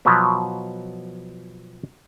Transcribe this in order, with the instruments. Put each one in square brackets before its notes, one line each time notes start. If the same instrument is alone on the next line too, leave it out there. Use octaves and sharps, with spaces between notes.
[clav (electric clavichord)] B2 F3 F#3 B3